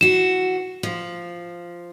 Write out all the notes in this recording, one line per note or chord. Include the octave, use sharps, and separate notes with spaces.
E3 F#4 E7
F3